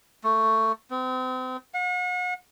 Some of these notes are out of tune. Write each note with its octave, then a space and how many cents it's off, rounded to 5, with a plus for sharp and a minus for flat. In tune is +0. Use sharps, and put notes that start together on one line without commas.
A3 +15
C4 -35
F#5 -40